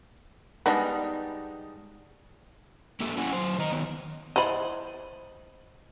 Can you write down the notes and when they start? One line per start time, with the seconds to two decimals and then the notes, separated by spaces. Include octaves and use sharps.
0.66 G3 G#3 B3 D4 D#4
3.00 A#3 G4 A4 E5
3.18 C#4 E4 F#5 G#5
3.33 F#3 C5
3.58 D#3 D#5 A#5
3.72 D#3 B3
4.36 E3 C5 D#5 B5